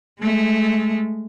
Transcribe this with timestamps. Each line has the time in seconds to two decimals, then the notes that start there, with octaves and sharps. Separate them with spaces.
0.21 G#3 A3